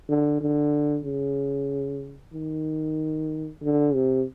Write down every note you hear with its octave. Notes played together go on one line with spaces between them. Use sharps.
D3
D3
C#3
D#3
D3
C3